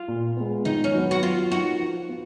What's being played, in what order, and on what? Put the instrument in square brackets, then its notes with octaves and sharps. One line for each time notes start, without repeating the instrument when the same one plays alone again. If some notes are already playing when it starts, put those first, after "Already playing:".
Already playing: [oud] F4
[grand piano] A#2
G#3 B3
[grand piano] D#3 [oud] D#4
[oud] C#4
[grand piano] F#3 B3
[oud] F#4
[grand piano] F#3 [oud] F4
[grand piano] A#3 D#4 [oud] F#4
[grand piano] F3
B3 F4